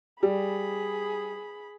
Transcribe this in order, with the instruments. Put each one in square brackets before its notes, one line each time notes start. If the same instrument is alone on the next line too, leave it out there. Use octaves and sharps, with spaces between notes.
[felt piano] G3 [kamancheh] G#4 B5